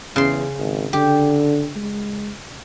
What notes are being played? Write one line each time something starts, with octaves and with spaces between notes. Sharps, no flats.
E2 C#3 C6
G#1
D3 G4
G#3